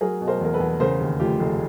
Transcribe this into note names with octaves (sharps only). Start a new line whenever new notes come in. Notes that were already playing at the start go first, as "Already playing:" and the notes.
F#3 G#4 A#4
B2
A#4 C5
E2 A#4
A4 B4
E2
C#3 A#4 C5
D#2
F1 F4 G4
F1